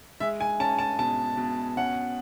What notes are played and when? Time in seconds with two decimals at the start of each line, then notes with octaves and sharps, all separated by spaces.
0.20 G#3 E5
0.41 G#5
0.60 C#4 A5
0.79 A5
0.99 B2 A5
1.37 B2
1.77 C#4 F#5